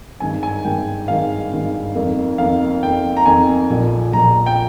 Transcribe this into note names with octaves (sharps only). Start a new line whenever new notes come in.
G#1 G2 D#3 G#3 G#5
G#5
G#1 G2 D#3 G#3 G5
G#1 G2 D#3 G#3 F5
G#1 G2 D#3 G#3
F2 D#3 A#3
F2 D#3 A#3 F5
F2 D#3 A#3 G5
A#5
F2 D#3 A#3 G#5
A#1 A#2 F3
A#1 A#2 F3 A#5
G5